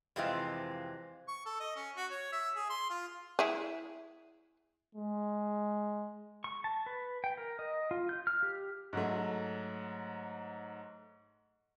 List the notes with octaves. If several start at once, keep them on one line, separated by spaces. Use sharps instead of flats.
F2 C3 E3 G#3 C4 F4
C#6
A4
D#5
C#4
F#4
C#5
E5
G#4
C6
F4
E4 G#4
G#3
C#6
A5
B4
G5
A#4
D#5
F4
G6
F6
G4
G#2 F#3 A3